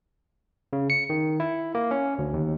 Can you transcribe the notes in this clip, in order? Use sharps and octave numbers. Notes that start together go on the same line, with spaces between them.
C#3
C#7
D#3
E4
A#3
C#4
D2
D#2